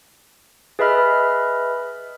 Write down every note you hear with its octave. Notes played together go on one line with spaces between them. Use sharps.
G#4 B4 D#5 E5 B5 F6